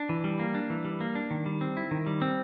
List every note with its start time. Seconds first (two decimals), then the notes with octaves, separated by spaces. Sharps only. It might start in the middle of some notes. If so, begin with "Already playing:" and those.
Already playing: D4
0.09 E3
0.24 G3
0.39 A#3
0.54 D4
0.70 E3
0.85 G3
1.01 A#3
1.15 D4
1.31 D#3
1.46 G3
1.61 C4
1.77 E4
1.91 D#3
2.07 G3
2.22 C4